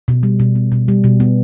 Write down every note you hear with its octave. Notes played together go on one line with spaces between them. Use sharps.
B2
G3
B2
B3
B2
G3
B2
B3